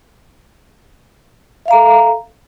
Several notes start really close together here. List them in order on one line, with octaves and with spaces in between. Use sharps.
E5 F5 A#5 A4